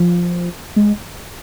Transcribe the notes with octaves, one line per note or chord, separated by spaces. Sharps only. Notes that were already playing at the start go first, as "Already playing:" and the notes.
Already playing: F3
G#3